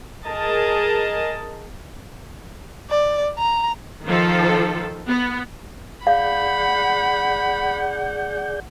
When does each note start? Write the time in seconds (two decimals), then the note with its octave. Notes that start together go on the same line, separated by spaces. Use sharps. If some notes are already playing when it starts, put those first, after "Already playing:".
0.25 G#4 A#4 D#5 A5
2.90 D5
3.38 A#5
4.04 D#3 F3 A4
5.08 B3
6.07 G#4 D5 F5 F#5 B5 G6